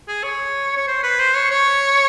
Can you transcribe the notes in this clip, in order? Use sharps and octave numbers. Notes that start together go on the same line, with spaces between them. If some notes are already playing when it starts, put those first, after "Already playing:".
G#4
C#5
C#5
C5
B4
C5
C#5
C#5